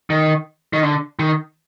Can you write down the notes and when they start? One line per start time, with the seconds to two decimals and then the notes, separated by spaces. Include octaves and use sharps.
0.10 D#3
0.73 D#3
0.83 D3
1.19 D#3